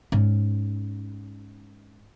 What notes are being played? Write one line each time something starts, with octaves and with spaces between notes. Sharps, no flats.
G#2 C#4